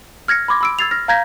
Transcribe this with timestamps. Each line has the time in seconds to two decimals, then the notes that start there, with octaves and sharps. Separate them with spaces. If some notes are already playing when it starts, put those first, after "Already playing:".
0.28 F6 G#6 A#6 C#7
0.48 B5 C6 D6 G#6 A#6
0.61 B5 E6 D7
0.79 E6 G#6 A6 C7 F7
0.91 F6 A#6
1.08 F5 A#5 G6 G#6 A#6 B6